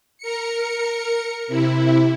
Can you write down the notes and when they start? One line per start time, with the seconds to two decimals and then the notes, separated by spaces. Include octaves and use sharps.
0.18 A#4 C#7
1.47 C3 E4